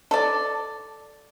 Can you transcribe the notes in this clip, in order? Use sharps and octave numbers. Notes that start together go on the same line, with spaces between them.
A4 D5